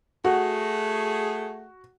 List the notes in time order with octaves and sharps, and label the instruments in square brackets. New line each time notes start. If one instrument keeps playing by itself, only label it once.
[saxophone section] A3 G#4 [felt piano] F#4